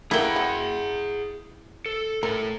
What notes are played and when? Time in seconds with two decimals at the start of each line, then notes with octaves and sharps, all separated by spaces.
0.11 A3 A#3 E4 G#4 A#4 F#5 G5
0.36 F#3
1.86 A4
2.23 A2 A4 A#4